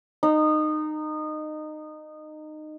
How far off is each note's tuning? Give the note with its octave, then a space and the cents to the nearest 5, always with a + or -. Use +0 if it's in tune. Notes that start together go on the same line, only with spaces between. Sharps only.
D#4 -20